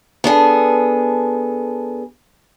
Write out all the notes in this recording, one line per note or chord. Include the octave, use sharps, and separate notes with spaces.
B3 D4 G#4 A4